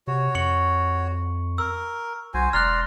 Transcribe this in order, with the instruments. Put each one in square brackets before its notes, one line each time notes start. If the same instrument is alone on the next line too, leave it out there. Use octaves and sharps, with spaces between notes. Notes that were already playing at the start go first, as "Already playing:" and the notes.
[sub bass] C3 [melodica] F#4 C#5
[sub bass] F2 [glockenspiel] C#6 C#7 F#7
[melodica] A#4 [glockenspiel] E6
[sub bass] B1 [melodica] F#4 C5 G#5
[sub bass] E1 [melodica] D5 A#5 C6 [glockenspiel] F6 F#6